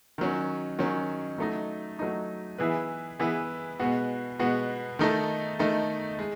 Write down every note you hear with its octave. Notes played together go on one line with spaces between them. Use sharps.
D#3 F#3 C#4
D#3 F#3 C#4
F#3 A3 D#4
F#3 A3 D#4
E3 B3 E4 G#4 B4
E3 B3 E4 G#4 B4
B2 G#3 B3 F#4
B2 G#3 B3 F#4
D#3 A3 D#4 A4
D#3 A3 D#4 A4
G#3